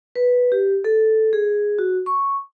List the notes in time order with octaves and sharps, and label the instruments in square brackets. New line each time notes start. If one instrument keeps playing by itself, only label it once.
[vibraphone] B4
G4
A4
G#4
F#4
C#6